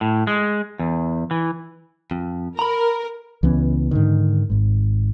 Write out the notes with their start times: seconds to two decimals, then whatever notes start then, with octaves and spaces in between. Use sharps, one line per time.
0.01 A2
0.27 G#3
0.79 E2
1.31 E3
2.11 F2
2.59 A#4 A#5 B5
3.43 C#2 E3 B3 C#4
3.91 G#2 D3 D#3
4.50 G#1 G#2